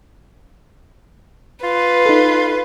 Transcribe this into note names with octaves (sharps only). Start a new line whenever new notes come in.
F4 B4
D#4 A4